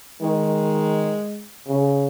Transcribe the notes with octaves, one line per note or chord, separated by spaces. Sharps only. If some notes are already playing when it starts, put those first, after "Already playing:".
D#3 G#3
C#3